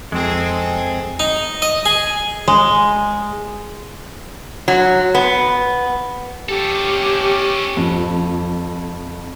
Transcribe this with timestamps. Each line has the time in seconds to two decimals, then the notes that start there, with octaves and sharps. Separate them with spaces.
0.12 F2 G#3 C4 G#4 A4
1.20 D#4
1.62 D#5
1.86 G#4
2.48 G#3
4.68 F#3
5.15 B3
6.49 C#4 G4 A4
7.77 F2